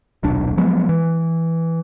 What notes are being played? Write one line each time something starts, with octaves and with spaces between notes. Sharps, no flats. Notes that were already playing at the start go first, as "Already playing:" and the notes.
D#1 B1 D4
F3 F#3 G#3 B3
E3